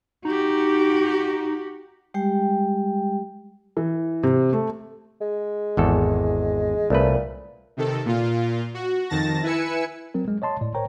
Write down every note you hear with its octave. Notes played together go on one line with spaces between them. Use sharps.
D#4 F#4 G4
G3 G#3 G4 G5
E3
C3
A3
G#3
G#1 E2 A4
C2 A#2 A3 B4
C3 D#3 A4
A#2 F4
F#4
F2 D#3 A5 A6 A#6
E4 B4 G#5 E6 C#7
F#3 C4 A#4
G#3
C#5 D#5 A5 C6
A2 D5
A#4 C5 C#5 G5 A#5